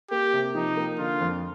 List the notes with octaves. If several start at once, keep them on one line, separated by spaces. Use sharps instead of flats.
A#3 G4
C3
F3 D#4
A#3
D3 F4
F2